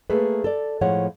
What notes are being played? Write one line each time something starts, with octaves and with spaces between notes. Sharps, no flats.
A3 A#3 G#4 A4 B4
A4 D5
A2 F3 G#3 C#5 F#5